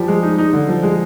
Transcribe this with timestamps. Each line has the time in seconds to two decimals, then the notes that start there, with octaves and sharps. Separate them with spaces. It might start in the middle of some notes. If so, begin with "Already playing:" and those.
Already playing: F3 G3 G4
0.08 G#3
0.23 D#4
0.38 D#4
0.53 D3
0.68 F3
0.83 G#3